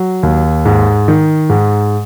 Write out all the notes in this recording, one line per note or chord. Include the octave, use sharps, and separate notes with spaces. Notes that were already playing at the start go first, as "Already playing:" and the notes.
Already playing: F#3
D#2
G#2
D#3
G#2